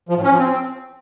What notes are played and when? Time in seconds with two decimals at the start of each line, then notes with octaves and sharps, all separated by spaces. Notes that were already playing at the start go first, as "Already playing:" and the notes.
0.09 F3
0.16 A2
0.24 C#4
0.31 F3
0.39 C4